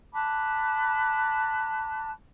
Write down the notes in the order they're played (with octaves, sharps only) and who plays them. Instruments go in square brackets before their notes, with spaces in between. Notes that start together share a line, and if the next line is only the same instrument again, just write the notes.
[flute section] A5 B5 D6 F#6